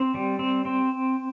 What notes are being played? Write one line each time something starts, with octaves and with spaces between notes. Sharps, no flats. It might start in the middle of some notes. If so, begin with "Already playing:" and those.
Already playing: C4
G3
C4
C4